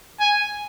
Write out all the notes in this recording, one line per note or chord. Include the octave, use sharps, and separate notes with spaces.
G#5